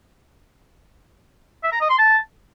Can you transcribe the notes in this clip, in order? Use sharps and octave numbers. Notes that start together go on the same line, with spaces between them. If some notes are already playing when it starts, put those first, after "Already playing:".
E5
A#5
D#5
C6
A5